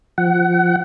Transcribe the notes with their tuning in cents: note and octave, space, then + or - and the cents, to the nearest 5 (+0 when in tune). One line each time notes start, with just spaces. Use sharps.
F3 +0 F#5 +25